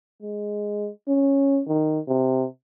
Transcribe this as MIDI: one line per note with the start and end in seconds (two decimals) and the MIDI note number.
0.23 0.90 56
1.08 1.61 61
1.67 2.00 51
2.08 2.46 48